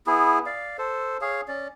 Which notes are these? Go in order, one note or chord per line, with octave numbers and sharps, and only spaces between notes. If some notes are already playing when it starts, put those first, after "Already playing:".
B3 E4 G#4
D5 F5
A4 C5
G#4 C#5 F5
C#4 D5